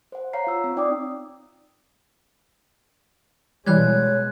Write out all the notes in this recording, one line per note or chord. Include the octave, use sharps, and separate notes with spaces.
C5 F#5
C#5 F5 A#5 C7
F4 E6
C4
D#4 D5 G5 D6 D#6
B2 E3 G3 G#3 C#5 F#6 G#6